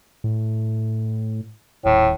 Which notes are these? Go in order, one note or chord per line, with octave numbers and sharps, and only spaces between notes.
A2
D#1 A2